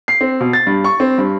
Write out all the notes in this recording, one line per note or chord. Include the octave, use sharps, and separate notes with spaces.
C7
C4
B2
A6
G2
C#6
C4
G2